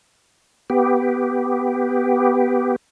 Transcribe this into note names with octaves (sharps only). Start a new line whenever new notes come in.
B3 G4